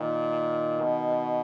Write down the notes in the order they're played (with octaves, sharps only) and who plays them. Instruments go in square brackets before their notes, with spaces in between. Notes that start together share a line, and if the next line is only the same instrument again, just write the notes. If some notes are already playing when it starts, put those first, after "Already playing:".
Already playing: [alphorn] A#2 [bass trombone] D#3
[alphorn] B2